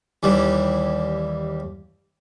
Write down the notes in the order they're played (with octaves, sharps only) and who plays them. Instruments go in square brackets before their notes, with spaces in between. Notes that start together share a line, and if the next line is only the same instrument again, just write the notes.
[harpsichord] D#2 E3 G3